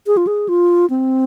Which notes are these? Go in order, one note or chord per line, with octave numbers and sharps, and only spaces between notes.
G#4
F4
G#4
F4
C4